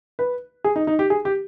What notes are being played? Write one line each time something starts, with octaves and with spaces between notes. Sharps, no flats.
B4
G#4
D#4
D#4
G4
G#4
G4